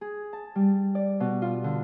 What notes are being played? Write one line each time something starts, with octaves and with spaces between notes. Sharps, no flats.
G#4
A5
G3
D5
B2
F4
D3